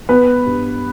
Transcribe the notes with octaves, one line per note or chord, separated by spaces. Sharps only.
B3 B4
G2